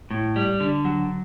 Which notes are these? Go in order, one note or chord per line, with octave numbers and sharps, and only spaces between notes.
A2
G3
D3
F#3